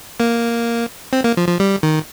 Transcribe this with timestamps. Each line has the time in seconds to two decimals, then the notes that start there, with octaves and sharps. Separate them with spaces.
0.20 A#3
1.13 C4
1.24 A#3
1.37 F3
1.49 F3
1.60 G3
1.83 D#3